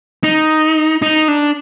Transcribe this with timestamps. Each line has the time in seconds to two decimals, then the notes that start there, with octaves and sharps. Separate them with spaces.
0.24 D#4
1.02 D#4
1.28 D4